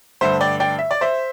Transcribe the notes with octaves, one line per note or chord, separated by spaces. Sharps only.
G2 D3 A3 C5 E5
D5 G5
D5 G5
E5
D5
C5 E5